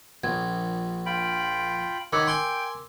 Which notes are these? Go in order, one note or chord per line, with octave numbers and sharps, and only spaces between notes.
A#1 G#6
F4 G5 B5
D#3 A#4 C#5 F#5 B5 D6 E6
G5 G#5 C6